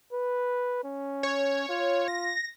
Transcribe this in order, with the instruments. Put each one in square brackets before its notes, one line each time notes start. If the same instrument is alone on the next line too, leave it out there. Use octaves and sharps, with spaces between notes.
[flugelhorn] B4
C#4
[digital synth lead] C#5
[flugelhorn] F4
[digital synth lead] A#6